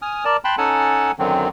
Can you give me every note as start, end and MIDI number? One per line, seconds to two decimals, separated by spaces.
0.02 0.24 80
0.02 0.24 87
0.02 0.24 89
0.25 0.37 70
0.25 0.37 74
0.25 0.37 81
0.45 0.56 79
0.45 0.56 81
0.45 0.56 83
0.45 0.56 84
0.45 0.56 90
0.58 1.12 61
0.58 1.12 63
0.58 1.12 69
0.58 1.12 78
0.58 1.12 80
0.58 1.12 81
1.19 1.48 42
1.19 1.48 50
1.19 1.48 51
1.19 1.48 54
1.19 1.48 60